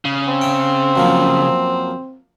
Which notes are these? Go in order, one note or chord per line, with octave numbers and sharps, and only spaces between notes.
C#3
C4
E5 G5
F#2 F3 A#3